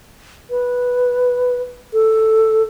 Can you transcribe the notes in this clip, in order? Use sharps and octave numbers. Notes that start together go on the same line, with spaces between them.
B4
A4